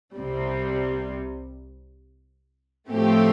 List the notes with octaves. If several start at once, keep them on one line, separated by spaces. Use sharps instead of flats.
C2 C3 G3
A2 F3 A3 C4 G4